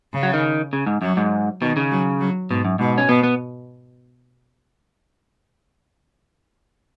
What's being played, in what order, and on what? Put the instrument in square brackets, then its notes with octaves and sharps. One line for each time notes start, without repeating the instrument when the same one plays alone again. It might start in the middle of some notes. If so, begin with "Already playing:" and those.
[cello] C#3
[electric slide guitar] F#3
D#3
C#3
G#2
[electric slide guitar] F#2 [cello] F#3
[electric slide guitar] G#2
[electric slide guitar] B2 [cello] D#3
[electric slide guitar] C#3
[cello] F#3
F#3
[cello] G#2 [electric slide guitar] B2
[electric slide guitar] F#2
[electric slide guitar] G#2 [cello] B2
[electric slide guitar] C#4
[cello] B2 [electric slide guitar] B3
[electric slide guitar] B3